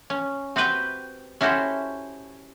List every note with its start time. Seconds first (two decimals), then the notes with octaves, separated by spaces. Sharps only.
0.10 C#4
0.56 C4 F#4 G4 B4 G5
1.41 C#4 E4 F#4 G4 A4 C5